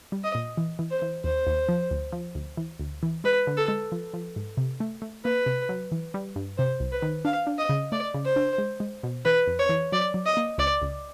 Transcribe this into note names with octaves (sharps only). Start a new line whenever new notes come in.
G3
D#5
A#2
E3
E3
C5
E3
D#2 C5
D#2
F3
D2
F3
D2
E3
D2
E3
G#3 B4
D3
A4
G#3
F3
F3
G#2
C3
A3
A3
A#3 B4
C3
F#3
E3
G3
G2
C3 C5
C2
B4
D#3
D4 F5
D4
D#5
C#3
A3 D5
C#3
C5
D4
G#3
G#3
B2
E3 B4
F2
C#5
E3
F#3 D5
F#3
D#5
A#3
C#2 D5
C#2